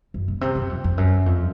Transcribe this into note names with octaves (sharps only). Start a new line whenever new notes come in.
F#2
A#2
C3
F#2
F2
F2
F#2
F2